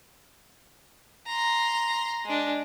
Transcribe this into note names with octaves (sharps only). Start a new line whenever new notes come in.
A#5 C6
G#3 D4